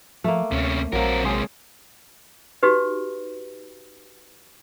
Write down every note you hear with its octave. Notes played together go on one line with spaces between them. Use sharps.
F3 A3 A#3
D2 C3 C#4
A#1 F#3 A#3 C4 A#4
C3 G#3 G#4 C5 C#5
D#4 F#4 G4 B4